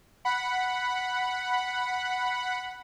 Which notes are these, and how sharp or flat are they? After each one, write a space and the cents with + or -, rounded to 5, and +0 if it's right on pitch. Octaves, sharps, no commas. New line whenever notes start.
F#5 +0 B5 +0